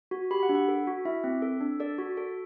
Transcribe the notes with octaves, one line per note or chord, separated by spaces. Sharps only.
F#4
G4 B5
F#5
D4
F#5
A4
F#4
E4 E5
C4
A4
D4
A4 D5
F#4
A4